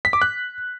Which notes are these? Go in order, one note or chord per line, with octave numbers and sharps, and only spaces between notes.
B6
D6
F#6